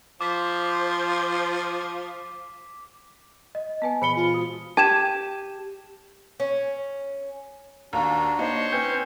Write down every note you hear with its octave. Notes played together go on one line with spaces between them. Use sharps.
F3 C5 D6 B6
D#5
B3 B4 D#5 G#5 A5
A#2 E3 B3 C5 B5 C#7 G7
F4
G#3 F#4
G4 A5 G#6 E7
C#4
D#2 D4 F#4 A#5
A#3 D#4 C5 C#5
C4 C#4 B4 G6